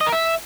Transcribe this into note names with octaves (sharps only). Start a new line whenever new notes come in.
D#5
A#4
E5